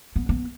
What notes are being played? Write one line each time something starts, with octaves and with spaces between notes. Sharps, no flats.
B3
B3